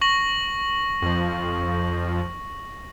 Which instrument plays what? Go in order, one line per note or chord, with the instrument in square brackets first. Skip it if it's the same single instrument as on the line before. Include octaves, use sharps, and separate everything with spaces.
[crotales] C#6 A#6 F#7
[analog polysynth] F2 F3